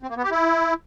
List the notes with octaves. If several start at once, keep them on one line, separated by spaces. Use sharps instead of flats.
C4
A#3
B3
G4
E4